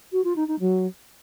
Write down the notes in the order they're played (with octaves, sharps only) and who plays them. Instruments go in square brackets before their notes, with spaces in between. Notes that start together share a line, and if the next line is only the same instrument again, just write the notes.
[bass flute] F#4
F4
D#4
D#4
F#3